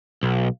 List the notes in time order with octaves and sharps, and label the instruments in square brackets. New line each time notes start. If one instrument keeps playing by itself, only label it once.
[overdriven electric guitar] B1